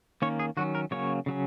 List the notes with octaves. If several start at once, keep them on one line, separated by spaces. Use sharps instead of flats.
D#3 A#3 C#4 C#5
G#4
D#3 F#3 C#4 F#4
A#4
C#3 F#3 A#3 C#4 C#5
C#3 F#3 C#4